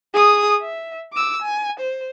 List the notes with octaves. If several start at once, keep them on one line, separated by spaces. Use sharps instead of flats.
G#4 D#6
E5
D6 E6
G#5
C5